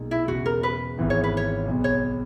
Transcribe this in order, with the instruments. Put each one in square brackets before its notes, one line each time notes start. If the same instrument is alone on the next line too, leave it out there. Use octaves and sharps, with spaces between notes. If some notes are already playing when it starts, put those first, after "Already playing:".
Already playing: [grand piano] B1 A#2 G#3 D#4
[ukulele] E4
[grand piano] E1 E2 C#3 [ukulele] F#4
[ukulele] A#4
B4
[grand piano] G#1 G#2 E3 B3
[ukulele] C#5
B4
C#5
[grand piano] B1 B2 G#3 B3
[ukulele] C#5